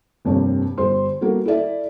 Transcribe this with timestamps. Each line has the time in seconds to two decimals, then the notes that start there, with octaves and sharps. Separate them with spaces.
0.25 F1 G2 A#3 C4 C#5
0.78 G1 G3 C5 C6
1.21 G3 A#3 B3 F#4 A4
1.45 E4 A4 D5 E5